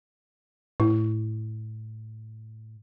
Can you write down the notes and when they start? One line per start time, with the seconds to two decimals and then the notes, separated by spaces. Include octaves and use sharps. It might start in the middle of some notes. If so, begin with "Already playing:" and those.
0.80 A2 E4